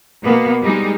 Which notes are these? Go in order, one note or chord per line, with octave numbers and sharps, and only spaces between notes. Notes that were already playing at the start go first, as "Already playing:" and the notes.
B2 A#3 B3
G3 G#3 D#4